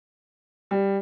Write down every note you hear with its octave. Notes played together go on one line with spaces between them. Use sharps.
G3